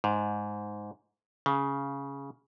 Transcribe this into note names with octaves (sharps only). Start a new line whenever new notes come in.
G#2
C#3